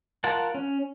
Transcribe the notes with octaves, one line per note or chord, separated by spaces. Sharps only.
F4 A#4 F#5 A5
C#4